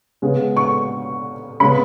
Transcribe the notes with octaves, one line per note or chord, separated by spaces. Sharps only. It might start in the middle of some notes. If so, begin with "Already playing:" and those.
C#3 G#3 B3
C#6
C#3 G#3 B3 B5